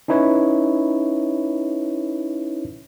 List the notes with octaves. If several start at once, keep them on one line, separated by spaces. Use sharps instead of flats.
C#4 D#4 E4 B4 C#5